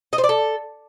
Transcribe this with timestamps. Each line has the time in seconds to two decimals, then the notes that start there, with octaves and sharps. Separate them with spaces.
0.13 D#5
0.18 C5
0.24 D5
0.29 A4